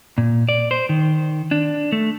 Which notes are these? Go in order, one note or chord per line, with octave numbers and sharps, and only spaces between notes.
A#2
D5
C5
D#3
D4
A3